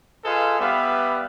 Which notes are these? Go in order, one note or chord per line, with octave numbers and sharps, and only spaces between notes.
F4 G#4 A4 B4 D#5 F5
G3 B3 B4 E5 F5